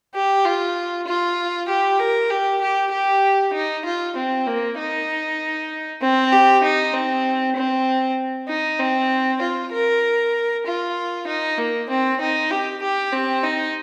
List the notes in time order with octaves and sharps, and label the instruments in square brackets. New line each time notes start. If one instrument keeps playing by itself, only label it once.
[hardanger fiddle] G4
F4
F4
G4
A#4
G4
G4
G4
D#4
F4
C4
A#3
D#4
C4
G4
D#4
C4
C4
D#4
C4
F4
A#4
F4
D#4
A#3
C4
D#4
G4
G4
C4
D#4